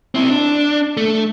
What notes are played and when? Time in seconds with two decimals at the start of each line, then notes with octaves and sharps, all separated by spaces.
0.15 C4 E4
0.30 D4
0.97 A3